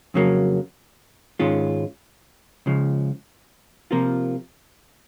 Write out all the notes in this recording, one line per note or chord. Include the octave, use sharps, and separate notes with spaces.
F2 C#3 F#3 A#3
G#2 D#3 G#3 C#4 F4
C#2 C#3 F3
C3 F3 A#3 F4 A#4